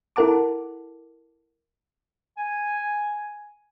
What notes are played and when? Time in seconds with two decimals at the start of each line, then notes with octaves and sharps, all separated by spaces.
0.16 E4 A4 A#4 F#5 A5 D6
2.38 G#5